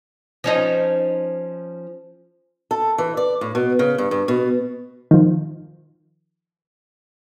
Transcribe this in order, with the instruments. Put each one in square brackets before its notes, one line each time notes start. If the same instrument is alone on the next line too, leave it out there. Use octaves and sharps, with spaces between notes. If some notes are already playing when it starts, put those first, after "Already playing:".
[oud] F3 C#4 D#4
[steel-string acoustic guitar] A4
E3
D5
A2
B2
C#3
G2
G2
B2
[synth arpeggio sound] D#3 F3